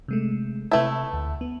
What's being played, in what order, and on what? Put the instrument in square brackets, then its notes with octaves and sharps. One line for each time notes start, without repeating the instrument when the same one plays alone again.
[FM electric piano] C3 G#3 A3
[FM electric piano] C3 B4 A5 [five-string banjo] A3 E4
[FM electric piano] D2
B3